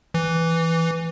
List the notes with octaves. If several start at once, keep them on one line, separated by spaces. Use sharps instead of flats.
E3